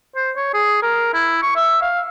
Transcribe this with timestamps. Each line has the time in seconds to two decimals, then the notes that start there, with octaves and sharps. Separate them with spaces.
0.16 C5
0.36 C#5
0.54 G#4
0.82 A#4
1.14 E4
1.42 C#6
1.56 E5
1.82 F5